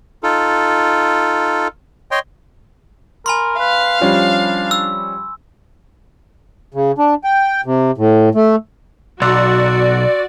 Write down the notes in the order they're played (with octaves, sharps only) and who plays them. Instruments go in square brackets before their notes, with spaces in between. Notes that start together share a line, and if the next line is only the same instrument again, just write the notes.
[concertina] D#4 F4 A4
C#5 D#5 G5 C6
[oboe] A#4 [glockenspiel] G#5 B5 C6
[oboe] B4 [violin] F5
[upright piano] F3 G3 C#4 [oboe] D4
[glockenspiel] E6
[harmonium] C#3
D4
G5
C3
A2
A3
[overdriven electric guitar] B1 [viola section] F#4 [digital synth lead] D5 [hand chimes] C6 E6 F#6